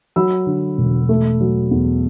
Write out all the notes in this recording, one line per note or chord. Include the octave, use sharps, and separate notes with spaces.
F#3 B5 E6
D3
E1
A3
F#3
E2